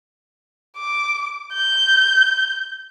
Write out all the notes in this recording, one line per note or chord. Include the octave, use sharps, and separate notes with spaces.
D6
G6